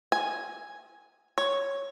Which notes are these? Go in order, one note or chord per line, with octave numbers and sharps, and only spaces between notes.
G#5
C#5